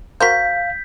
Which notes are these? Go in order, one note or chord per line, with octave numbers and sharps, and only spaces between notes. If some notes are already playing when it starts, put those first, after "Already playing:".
F#4 A#4 C5 F5 G6 B6